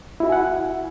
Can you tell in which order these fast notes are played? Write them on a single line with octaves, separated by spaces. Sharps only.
E4 F#4 E5 G#5 F#5